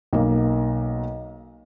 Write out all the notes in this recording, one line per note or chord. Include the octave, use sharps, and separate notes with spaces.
B1 A#3